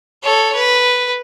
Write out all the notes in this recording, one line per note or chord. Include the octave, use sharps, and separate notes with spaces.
A4 C#5
B4